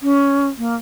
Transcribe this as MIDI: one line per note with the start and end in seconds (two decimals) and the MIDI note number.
0.01 0.47 61
0.58 0.75 58